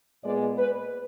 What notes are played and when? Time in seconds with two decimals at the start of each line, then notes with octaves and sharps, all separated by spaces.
0.23 A#2 G#3 B3 D5
0.58 B4